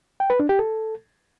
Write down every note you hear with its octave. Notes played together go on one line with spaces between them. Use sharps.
G5
B4
D4
G4
A4